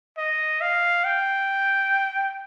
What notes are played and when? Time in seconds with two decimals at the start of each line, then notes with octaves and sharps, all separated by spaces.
0.17 D#5
0.61 F5
1.05 G5